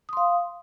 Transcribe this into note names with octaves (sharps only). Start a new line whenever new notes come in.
F5 C6 D#6